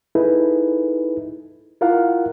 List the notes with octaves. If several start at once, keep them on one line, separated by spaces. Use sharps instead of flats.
D#4 E4 G#4 A4 B4
E4 F4 A#4 F5 F#5